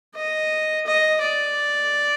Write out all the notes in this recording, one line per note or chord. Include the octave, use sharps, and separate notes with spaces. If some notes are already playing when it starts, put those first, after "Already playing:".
D#5
D#5
D5